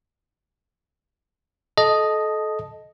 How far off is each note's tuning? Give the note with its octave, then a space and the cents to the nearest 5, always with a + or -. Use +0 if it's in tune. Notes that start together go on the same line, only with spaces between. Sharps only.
A4 -25 D#5 +0 A5 -5